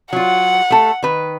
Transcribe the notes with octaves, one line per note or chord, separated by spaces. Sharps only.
F#3 F4 F#5
A3 A4
D#3 B4